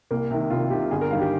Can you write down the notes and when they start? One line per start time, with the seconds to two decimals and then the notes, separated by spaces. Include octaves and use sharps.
0.11 C2 A#3
0.31 C3 D#3
0.50 C2 F4
0.70 C3 D#3 G4
0.91 G1 G#4
1.01 A#4
1.11 G2 D#3 G3 F5
1.21 G4